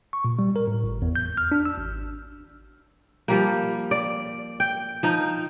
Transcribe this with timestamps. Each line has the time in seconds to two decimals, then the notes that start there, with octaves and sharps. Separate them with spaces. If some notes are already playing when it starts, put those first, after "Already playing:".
0.13 C#6
0.25 A#2
0.39 G3
0.56 A#4
0.68 A2
0.84 G1
1.02 E2
1.16 G6
1.37 F6
1.52 D4
1.65 E6
1.77 G#1
3.28 F3 G3 A#3
3.91 D5
4.60 G5
5.03 F3 D#4